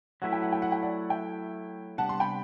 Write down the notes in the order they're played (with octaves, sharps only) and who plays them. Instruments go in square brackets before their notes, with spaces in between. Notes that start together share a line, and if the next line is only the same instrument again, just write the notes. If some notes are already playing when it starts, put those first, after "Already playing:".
[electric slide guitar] F#3 A3 E4 B4 [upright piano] F#5
[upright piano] G5
F#5
G5
F#5
G5
D5 F#5
E5 G5
[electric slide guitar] C3 G3 B3 D4 [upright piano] F#5 A5
[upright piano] C6
G5 B5